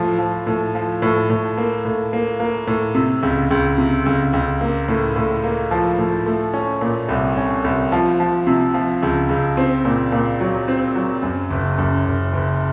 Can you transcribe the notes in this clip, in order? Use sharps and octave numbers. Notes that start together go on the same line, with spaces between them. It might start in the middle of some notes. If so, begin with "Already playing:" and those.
Already playing: A2 F3
F3
A2
F3
A2
A2
A#3
A2
A#3
A#3
A2
C3
C#2
C#2
C3
C#2
C#2
A#3
A2
A2
A#3
F3
A2
A3
C#4
A#2
C2
C#4
C2
F3
F3
C3
F3
C#2
C#2
C4
A#2
A#2
F#3
C4
F#3
F#2
F#1
F#2
F#1
F#1